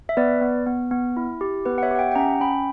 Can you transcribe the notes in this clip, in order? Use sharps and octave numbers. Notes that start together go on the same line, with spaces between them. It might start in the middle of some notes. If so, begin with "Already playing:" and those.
E5
B3 B4 D5
B3
B3
B3
E4
G4
B3 B4
F#5
C#5 E5
G4 F#5
E5 G5
G5
C#4 F#5 A#5
C#4 G5 B5